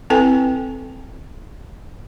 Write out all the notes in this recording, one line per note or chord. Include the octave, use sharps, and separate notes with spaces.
C4 E4 A4 B4 G5 G#5